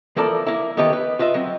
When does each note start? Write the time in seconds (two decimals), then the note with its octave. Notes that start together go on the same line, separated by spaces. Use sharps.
0.16 E3 F3 A#3 A4 A#4 D5
0.47 A#3 E4
0.77 D#3 E3 B3 G4 A4 B4
0.93 B4
1.19 F4 B4 D#5 E5
1.34 F#3 C4